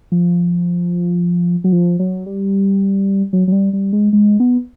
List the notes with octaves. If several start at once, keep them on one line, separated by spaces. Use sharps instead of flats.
F3
F#3
F3
F#3
G3
F#3
F#3
G3
G3
G#3
G#3
B3